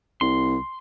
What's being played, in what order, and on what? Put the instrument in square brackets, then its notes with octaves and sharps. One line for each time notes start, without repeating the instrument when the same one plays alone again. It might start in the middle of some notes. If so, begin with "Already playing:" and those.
[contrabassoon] C2 [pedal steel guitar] C6